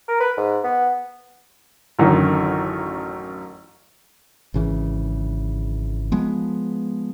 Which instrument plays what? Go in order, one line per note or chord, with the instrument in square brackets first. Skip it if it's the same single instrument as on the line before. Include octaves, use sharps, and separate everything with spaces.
[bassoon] A#4
B4
G#2
B3
[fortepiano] A1 F#2 D3 D#3 F#3
[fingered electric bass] G#1 C#3 E3
F3 G#3 B3